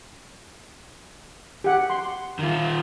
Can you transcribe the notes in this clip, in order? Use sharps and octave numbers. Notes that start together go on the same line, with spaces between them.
G4 F#5
C6
D#3 F4